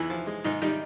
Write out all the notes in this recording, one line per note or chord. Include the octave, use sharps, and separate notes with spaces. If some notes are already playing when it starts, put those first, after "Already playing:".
Already playing: E2 E3 E4
F3
G#3
G#2 D#3 D#4
D#3 G3 D#4